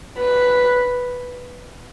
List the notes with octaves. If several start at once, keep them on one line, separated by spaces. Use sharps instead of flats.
B4